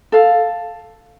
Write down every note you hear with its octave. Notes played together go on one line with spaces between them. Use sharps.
A4 F5